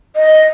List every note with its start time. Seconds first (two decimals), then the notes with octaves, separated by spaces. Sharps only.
0.16 D#5